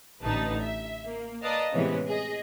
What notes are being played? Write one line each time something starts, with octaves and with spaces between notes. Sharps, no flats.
A1 D3 D#4 B4 A5
E5
A#3
B4 D5 D#5 F5 A5 A#5
A2 C3 E3 G#3 B3 C#4
G#4 D#5